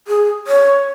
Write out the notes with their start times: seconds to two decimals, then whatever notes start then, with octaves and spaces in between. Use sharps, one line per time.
0.08 G#4
0.47 C#5